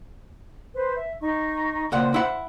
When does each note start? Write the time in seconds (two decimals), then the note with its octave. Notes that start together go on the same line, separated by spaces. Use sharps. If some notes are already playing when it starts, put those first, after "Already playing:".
0.75 B4 C5
0.96 E5
1.20 D#4 C#6
1.92 C#2 A#2 C5 F#5
2.14 E4 F#5